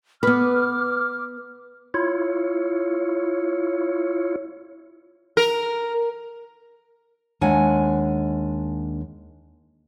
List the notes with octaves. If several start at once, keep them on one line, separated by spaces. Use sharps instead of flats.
B3 B4 D6 F6
E4 F4 C#5
A#4
D#2 G#3 D4 F#5 G#5